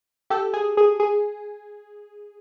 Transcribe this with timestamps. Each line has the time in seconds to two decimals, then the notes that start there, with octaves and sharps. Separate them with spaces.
0.30 G4 A4
0.54 G#4
0.77 G#4
1.00 G#4